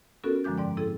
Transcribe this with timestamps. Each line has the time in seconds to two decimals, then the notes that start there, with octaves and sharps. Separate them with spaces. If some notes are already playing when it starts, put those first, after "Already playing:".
0.24 B3 C#4 F4 F#4 A4 A#4
0.44 F#2 D3 F3 G#3 D6 G6
0.58 G#2 D5 G5
0.77 C4 E4 G#4 A4